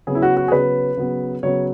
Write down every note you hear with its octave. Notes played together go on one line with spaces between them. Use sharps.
C#3 F#3 B3 G#4
E4
F#4
F#4
G#4
C#3 F#3 B3 B4
C#3 F#3 B3
C#3 F#3 B3 C#5